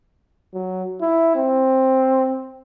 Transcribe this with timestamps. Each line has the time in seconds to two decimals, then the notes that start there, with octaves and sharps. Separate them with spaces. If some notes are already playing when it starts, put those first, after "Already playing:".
0.54 F#3
1.01 E4
1.36 C4